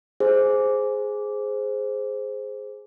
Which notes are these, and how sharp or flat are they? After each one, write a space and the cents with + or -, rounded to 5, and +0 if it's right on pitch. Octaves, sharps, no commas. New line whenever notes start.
G#4 +5 C5 +0